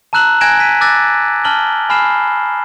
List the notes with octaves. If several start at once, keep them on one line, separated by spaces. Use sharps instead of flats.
A5 A#5 E6 F#6 E7 F#7
G#5 F#6 G#6 A#6 D7 E7
B6 D#7
D6 E6 F#6 A6 A#6
A5 F6 F#7 G7
G#5 B5 F6 C7 E7